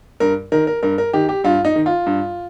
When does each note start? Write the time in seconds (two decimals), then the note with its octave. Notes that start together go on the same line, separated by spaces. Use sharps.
0.20 G2 A#4
0.52 D#3 A#4
0.67 A#4
0.83 G2 A#4
0.98 A#4
1.13 D#3 G4
1.29 G4
1.44 G2 F4
1.65 D#4
1.76 D#3
1.86 F4
2.06 G2